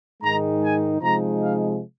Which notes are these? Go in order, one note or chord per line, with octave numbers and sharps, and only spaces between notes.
G#2 D#3 G#3 D#4 A#5
G#5
C3 F3 G#3 D#4 A#5
F5